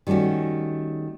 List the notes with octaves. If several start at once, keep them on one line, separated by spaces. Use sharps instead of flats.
D#3 G3 A3 C#4 F#4